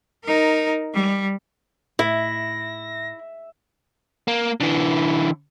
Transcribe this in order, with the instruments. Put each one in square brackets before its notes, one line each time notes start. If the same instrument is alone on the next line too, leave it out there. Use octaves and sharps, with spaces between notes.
[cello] D#4 A#4
G3
[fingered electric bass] A2 [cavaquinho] E4 [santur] E5 [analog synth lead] A#6
[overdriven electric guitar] A#3
D3 E3